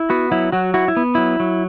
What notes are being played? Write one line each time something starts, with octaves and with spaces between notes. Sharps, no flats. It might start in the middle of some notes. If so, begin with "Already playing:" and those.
Already playing: E4
B3 F#4
F#3 E4
F#3 F#4
E4 F#4
E4
B3
F#3 E4
F#3